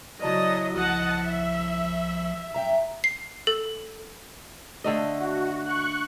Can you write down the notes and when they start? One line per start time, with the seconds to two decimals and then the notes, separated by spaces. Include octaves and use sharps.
0.22 C#3 F#3 E4 D5 D#5 A5 A#5 A6
0.75 C2 F3 D#5 F#5 A5
1.24 E5
2.54 F#2 E5 G5 A#5
3.04 C7
3.47 A4
4.84 D3 A3 D#5
5.20 F#4
5.65 C#6 F#6